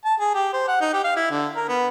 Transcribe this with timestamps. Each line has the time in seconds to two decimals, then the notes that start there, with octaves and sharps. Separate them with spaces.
0.05 A5
0.20 G#4
0.34 G4
0.53 C5
0.68 F#5
0.81 D#4
0.93 G4
1.04 F5
1.16 E4
1.31 D3
1.56 A#4
1.69 B3